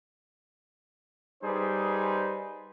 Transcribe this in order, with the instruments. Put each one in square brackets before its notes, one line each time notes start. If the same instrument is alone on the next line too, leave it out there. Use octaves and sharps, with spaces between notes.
[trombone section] G3 D#4 G#4 B4 C5